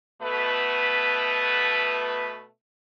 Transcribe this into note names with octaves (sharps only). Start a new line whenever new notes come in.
B2 A3 B4